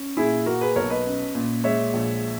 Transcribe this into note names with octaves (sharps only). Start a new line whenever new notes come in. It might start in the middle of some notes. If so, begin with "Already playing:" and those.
Already playing: C#4
A#2 E4 G#4
A#3 F#4 A#4
G#4 B4
B1 A#4 C#5
B4 D#5
C#4
A#2
G#3 C#5 E5
A#1